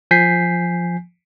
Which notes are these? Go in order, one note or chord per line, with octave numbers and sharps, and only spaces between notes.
F3 G#5 G6 B6 C7